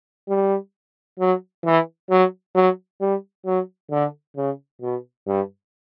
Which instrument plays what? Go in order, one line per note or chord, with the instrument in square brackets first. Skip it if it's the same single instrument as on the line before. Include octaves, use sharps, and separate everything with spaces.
[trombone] G3
F#3
E3
F#3
F#3
G3
F#3
D3
C#3
B2
G2